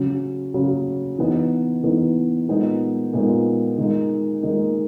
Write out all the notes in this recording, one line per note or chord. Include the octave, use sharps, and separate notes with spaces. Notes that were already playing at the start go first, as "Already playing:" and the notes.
Already playing: C#3 F#3 C#4
C#3 F#3 C#4
E3 B3 D#4
E3 B3 D#4
A#2 G#3 B3 D#4
A#2 G#3 B3 D#4
D#3 G#3 D#4
D#3 G#3 D#4